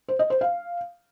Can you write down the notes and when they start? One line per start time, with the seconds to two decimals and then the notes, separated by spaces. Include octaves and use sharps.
0.08 C5
0.19 D#5
0.30 C5
0.41 F5